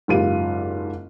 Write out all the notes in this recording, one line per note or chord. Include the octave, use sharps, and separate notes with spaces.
F#1 G#2 F4 G4 D#7